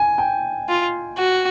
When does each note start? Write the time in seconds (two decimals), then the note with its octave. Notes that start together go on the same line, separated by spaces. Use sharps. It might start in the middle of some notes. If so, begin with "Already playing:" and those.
Already playing: G#5
0.18 G5
0.69 F4
1.18 F#4